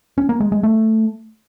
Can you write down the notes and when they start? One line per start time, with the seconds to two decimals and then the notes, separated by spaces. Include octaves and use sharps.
0.18 C#4
0.29 A#3
0.41 G#3
0.52 G#3
0.63 A3